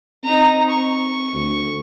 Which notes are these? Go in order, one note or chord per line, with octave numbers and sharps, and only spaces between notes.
C4 D#4 A#5
C#6
D2